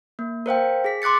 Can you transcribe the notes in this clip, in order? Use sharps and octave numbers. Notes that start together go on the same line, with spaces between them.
A#3
A#4 C5 F5 G5
G#4 B6
C6 D6 F#6 A6 C#7